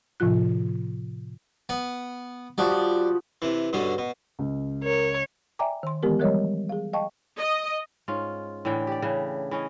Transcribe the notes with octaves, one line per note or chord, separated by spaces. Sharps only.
A2 C3 F3 F4 F#6
B3
F3 G3 F#4 D#6
C3 E3
G2 B2 D3 C#4
B2
C#2
A#4 C#5
D5 E5 G5 G#5 A#5 D6
D#3 C6
D#3 E3 G#3 B3 G4 A#4
F3 G3 G#3 A#4 C#5 D#5
G#4 F5
D#5 F5 G5 A5 C#6
D#5
G#2 C#4 F4
A2 D3 E3 G5
G4 D5
C#3 E3 D4
E3 C#4 D#5